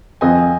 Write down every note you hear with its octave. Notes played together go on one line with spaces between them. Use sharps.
F2 D#5 G#5